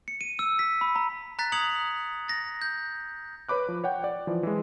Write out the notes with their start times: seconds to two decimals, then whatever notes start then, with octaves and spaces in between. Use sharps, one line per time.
0.08 C#7
0.21 D#7
0.39 E6
0.59 B6
0.81 B5
0.96 A#5
1.39 A#5 F#6 A6 B6
1.52 D#6 G#6 C#7 F7 F#7
2.28 A6 A#6
2.62 G6
3.49 B4 C#5 B5 D6 F#6
3.69 F3
3.84 C#5 F#5 G5
4.04 D5
4.27 E3 F3
4.43 E3 G#3